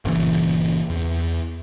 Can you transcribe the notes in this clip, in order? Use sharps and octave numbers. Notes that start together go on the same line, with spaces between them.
G1 A#2 C#3 E3
E2